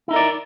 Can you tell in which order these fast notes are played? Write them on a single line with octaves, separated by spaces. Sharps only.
E4 D#4 A#4 D5